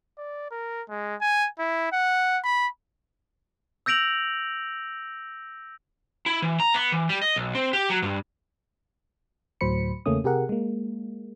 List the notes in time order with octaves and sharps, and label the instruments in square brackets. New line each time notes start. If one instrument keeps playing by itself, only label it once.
[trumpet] D5
A#4
G#3
G#5
E4
F#5
B5
[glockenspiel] E6 G6 A#6 D7 F7 F#7
[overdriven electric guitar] E4
E3
A#5
B3
E3
G3
D#5
B1
C4
G4
F#3
G2
[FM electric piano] D2 A2 F#3 C5 B5 C#7
E2 C#3 A3 A#3 C#4 D#6
C3 G4 G#4 A#4 F#5
G#3 A#3